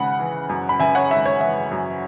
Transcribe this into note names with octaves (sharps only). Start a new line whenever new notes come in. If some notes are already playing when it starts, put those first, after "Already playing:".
Already playing: G#1 C#3 F#5 B5
E3
F#2
B5
C#3 E5 G#5
C#5 F#5
G#1 E5
C#5
E3 E5
F#2